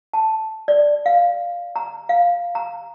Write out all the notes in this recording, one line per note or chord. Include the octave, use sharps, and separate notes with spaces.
A5
D5
F5
A#5
F5
A#5